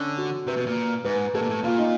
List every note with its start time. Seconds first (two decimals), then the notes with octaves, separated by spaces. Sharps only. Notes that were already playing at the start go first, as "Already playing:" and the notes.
Already playing: D3 C#4
0.18 F#4
0.47 C3 B4
0.57 B2
0.66 A#2
1.05 G#2 B4
1.34 A2 A4
1.42 A#2
1.49 A2
1.63 A#2 F4
1.78 D#4